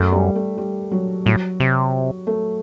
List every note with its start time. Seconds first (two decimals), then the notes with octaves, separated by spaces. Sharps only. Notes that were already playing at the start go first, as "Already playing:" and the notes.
Already playing: F#2 A3
0.12 G3
0.35 A3
0.58 G3
0.91 F#3
1.25 A2 F#3
1.60 C3
2.27 A3